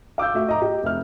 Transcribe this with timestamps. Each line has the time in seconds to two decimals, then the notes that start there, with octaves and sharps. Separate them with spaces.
0.18 F5 D6 E6 G6
0.34 A3 F#4 E5
0.49 D#5 A#5 D6
0.62 G4 D#5
0.83 F1 E5 F6